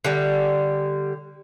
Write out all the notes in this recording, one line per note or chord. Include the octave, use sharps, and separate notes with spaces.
D3 G3